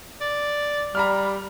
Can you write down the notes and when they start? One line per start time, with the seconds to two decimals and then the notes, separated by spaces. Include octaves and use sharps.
0.21 D5
0.95 G3 A#5 B5 F6